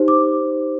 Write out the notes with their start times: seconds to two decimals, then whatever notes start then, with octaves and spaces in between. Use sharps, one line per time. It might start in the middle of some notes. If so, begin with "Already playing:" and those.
Already playing: D#4 G4 C5
0.08 D6